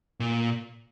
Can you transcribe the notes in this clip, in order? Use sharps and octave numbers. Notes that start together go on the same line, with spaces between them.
A#2